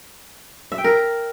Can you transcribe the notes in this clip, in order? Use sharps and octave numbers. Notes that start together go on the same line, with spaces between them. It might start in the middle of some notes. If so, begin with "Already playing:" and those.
E5
G5
A#4